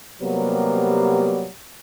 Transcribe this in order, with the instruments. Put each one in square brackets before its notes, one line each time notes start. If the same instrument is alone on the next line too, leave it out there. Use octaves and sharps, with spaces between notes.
[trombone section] C3 F#3 G3 A#3 B3